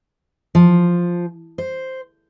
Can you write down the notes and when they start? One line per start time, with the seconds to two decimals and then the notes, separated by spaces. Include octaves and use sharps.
0.55 F3
1.58 C5